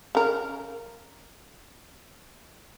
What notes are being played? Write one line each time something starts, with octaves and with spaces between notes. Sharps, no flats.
C#3 A#4